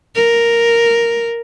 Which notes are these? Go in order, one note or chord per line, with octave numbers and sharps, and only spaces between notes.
A#4